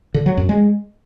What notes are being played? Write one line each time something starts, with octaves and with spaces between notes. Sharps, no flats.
D3
F#3
F#2
G#3